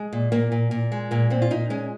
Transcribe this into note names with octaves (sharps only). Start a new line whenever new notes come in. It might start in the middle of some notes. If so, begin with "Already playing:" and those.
Already playing: G#3
A#2
A#2 A#3
A#2
A#2
G#3
A#2 A#3
A#2 C4
F4
A#2 D#4
G#3 C#4